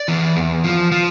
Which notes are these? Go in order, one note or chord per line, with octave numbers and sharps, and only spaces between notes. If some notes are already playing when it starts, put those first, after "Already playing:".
Already playing: D5
E3
E2
F3
F3